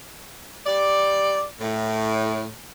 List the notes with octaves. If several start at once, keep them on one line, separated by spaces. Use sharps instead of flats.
G3 D5
A2